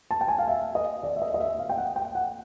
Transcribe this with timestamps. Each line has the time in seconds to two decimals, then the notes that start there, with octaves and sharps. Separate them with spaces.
0.11 A5
0.21 G5
0.28 G#5
0.39 F5
0.48 E5
0.75 D#5
1.03 D5
1.16 E5
1.22 D#5
1.34 D#5
1.40 E5
1.59 F5
1.69 G5
1.78 F#5
1.96 G5
2.15 F#5